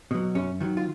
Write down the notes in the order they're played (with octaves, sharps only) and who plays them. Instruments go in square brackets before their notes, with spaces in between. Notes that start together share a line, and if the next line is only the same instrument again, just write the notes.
[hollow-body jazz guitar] B2 F#3
F#2 C#4
D#3 F#3
F4